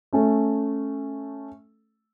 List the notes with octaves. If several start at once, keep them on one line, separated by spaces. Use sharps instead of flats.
A3 C#4 A4